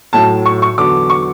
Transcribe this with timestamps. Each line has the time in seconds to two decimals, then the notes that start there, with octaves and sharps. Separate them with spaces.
0.13 A2 F#3 A5
0.46 C#6
0.62 C#6
0.77 E2 D3 F#3 D6
1.10 C#6